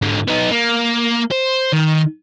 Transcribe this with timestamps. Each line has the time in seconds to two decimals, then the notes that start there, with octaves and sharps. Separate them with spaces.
0.02 G#2 D3
0.28 B3 D#4
0.51 A#3
1.32 C5
1.73 D#3